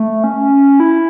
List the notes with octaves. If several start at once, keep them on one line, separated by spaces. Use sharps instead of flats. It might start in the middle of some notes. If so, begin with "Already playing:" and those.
Already playing: A3
C#4
E4